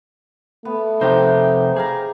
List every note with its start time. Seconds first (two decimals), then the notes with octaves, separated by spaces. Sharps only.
0.65 A3 B3
1.01 F2 C3 D#4 G4 C5
1.76 G#4 E5 F5 A#5